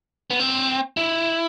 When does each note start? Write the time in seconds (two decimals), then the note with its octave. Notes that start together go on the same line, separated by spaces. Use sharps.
0.30 B3
0.39 C4
0.97 E4